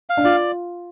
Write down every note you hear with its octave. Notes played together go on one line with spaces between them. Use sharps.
F5
D4
F4 D5